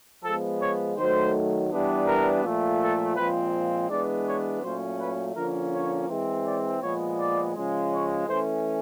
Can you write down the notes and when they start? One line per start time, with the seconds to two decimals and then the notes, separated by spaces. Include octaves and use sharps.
0.24 F3 G#3 B3 A4
0.61 C#5
0.97 D#3 F#3 A3 C5
1.71 E3 G3 B3 D4
2.07 A#4
2.44 A#2 F3 A3
2.80 A4
3.16 A#2 F3 G#3 C4 B4
3.90 E3 G#3 B3 D4 D5
4.26 C#5
4.63 A#2 F#3 A3 C#4 C5
4.99 B4
5.36 D3 F3 A#3 C#4 A#4
5.73 C#5
6.09 E3 G#3 C4
6.45 D5
6.82 A#2 F3 G#3 B3 C#5
7.18 D5
7.55 C#3 F3 G#3
7.91 C#5
8.28 E3 A3 C#4 C5